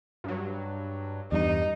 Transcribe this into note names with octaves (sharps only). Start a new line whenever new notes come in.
G2 F#3
E2 G2 D#4